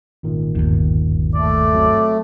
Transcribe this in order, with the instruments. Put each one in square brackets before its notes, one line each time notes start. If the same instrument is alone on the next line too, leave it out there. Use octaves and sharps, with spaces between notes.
[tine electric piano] G#1 A#2 D#3
[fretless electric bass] G1 D#2
[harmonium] A3 [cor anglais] D5
[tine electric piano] F#3 C4